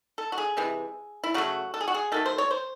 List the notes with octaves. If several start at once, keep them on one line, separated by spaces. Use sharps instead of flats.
A4
F#4
G#4
C3 E3 G#3
E4
C#3 F#3 A3 F#4
A4
G#4
F#4
G#4
D#3 F#3 A3 A4
C5
C#5
C5